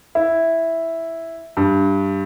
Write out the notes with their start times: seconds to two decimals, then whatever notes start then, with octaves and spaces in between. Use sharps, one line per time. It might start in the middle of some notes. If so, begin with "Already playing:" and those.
0.15 E4
1.57 G2